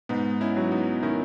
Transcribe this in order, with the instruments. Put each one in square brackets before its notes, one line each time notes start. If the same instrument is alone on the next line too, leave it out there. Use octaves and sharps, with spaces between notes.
[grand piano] G#2 [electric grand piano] B3 D#4
[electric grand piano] C#4 E4
[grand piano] F#3
[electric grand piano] B3 D#4
[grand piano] D#3 [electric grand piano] C#4 E4